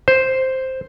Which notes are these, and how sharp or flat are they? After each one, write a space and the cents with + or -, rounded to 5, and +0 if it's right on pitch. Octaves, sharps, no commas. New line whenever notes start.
C5 +0